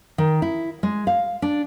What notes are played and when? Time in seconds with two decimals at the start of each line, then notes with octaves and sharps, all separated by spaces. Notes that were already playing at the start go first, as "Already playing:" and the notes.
0.18 D#3
0.42 E4
0.83 G#3
1.07 F5
1.42 D4